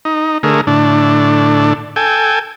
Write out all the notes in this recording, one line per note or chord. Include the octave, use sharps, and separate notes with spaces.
D#4
D3 A3 G#4 A#4
A2 D3 D4
A4 G5 G#5